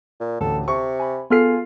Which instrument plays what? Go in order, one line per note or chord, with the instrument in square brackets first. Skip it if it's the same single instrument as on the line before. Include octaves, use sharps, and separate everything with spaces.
[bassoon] A#2
[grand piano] A1 D2 [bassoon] A4 [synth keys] A5
[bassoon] C3 [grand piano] C#6
[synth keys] G#5 B5
[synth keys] B3 A4 [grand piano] F4 F6 C7 [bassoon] G#4